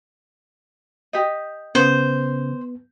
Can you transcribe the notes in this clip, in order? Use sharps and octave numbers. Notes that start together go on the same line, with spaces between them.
G4 D#5
C#3 B3 C5